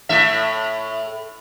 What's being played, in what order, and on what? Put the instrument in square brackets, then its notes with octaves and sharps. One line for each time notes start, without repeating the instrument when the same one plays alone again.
[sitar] A2 E5